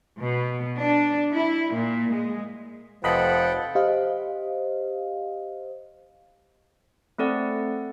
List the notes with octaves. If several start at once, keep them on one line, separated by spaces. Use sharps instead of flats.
B2
D4
E4
A#2
G#3
F1 F3 A4 B4 D#5 F#5 G5 B5
G4 C5 D#5 F5
A3 C4 A4 D5 F#5